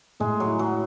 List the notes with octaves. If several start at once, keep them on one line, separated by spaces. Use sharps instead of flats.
A2 G#3
F#3
E4
F#3